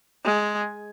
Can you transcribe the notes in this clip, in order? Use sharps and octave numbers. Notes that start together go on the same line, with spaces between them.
G#3